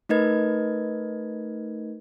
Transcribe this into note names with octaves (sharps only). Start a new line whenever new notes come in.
A3 D#4 A#4 B4 D#5 G#6